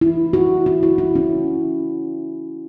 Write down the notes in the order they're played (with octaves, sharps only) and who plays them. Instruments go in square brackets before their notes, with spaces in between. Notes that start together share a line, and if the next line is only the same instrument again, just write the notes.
[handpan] E4
F#4
E4
F#4
E4
C#4